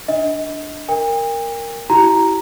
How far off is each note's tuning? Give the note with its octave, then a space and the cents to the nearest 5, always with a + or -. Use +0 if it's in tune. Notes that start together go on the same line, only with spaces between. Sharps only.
D4 +0 D#5 +30
A#4 -5 G5 +45
E4 +0 G4 -40 A#5 +0